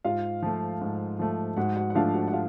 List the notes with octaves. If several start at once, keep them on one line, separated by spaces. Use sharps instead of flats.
G#2 F4 F5
F3 A3
G#2
F3 A3
G#2 F#4 F#5
F#4 F#5
F#5
F3 A3 D4 F4 F5
F#4 F#5
F#5
F4 F5